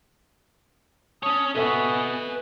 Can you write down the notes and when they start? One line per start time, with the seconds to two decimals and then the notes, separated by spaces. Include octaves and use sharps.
1.23 C#4 C#5 A5 D#6
1.55 B3 A4 B4 D#5 E5 G#5 C#6